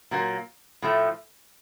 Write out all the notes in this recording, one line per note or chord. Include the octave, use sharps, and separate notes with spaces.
A#2 F#3 A#3
A2 F3 A3